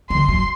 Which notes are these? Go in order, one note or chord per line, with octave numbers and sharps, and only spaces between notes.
D3 C6
F#3